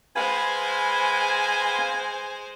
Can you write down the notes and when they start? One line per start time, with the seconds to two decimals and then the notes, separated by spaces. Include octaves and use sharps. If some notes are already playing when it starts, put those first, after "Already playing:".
0.16 G#3 B4 C5 F5 G#5 B5